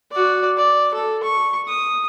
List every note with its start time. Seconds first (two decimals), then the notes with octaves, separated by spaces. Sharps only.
0.11 F#4 D5
0.58 D5
0.94 A4
1.23 C#6
1.68 D#6